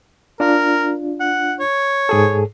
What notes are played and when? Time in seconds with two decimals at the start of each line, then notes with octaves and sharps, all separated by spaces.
0.40 D4 F4 A#4
1.20 F#5
1.59 C#5
2.09 G#2 G#4 A4